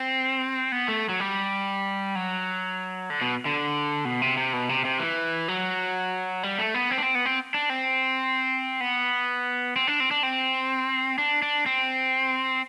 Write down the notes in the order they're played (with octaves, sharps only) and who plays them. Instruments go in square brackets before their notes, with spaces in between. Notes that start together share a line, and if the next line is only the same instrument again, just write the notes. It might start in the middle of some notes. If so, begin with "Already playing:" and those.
Already playing: [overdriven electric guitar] C4
B3
A3
F#3
G3
F#3
D3
B2
D3
B2
C3
C3
B2
C3
C3
E3
F#3
G3
A3
B3
C4
D4
C4
B3
C4
D4
C4
B3
C4
D4
C4
D4
C4
D4
D4
C4